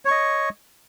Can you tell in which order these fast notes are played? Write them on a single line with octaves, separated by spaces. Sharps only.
C#5 C#6 D#5